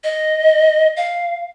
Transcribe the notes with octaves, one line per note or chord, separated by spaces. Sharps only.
D#5
F5